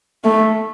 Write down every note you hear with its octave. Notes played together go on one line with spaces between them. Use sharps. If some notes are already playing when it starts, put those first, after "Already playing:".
A3